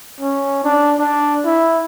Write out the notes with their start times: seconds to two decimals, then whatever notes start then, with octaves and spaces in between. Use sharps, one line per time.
0.21 C#4
0.64 D4
0.98 D4
1.45 E4